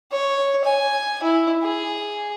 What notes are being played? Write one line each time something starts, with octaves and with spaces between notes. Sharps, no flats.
C#5
G#5
E4
G#4